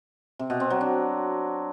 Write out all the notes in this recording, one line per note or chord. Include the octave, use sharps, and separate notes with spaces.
C3
B2
C4
F#3
D4